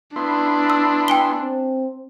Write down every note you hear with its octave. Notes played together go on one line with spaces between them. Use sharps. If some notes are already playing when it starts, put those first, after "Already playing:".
B3 D4 E4 C6
E6
G5 G#5 G7
C4